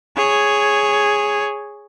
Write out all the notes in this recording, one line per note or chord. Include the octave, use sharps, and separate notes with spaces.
G#4 C#5